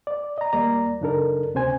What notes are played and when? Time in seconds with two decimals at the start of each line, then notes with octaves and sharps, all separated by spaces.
0.07 D5
0.38 D#5 A#5
0.53 D#2 G3 A#3 D5 A#5
1.01 F#2 C#3 D4 D#4 A4 A#4
1.54 D2 C3 C#4 C5 G#5